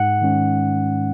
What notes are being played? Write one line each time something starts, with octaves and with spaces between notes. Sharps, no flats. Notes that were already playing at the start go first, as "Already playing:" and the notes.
Already playing: G#2 F#5
D#3 G#3 C#4